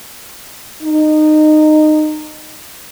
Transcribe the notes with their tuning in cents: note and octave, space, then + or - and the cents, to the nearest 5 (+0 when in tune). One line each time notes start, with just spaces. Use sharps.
D#4 -20